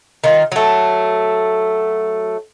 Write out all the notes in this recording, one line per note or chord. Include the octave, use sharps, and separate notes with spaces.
D#3 F4
F#3 A3